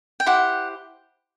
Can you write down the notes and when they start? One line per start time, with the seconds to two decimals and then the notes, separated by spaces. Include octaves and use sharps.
0.20 G5
0.26 E4 G4 C5 F#5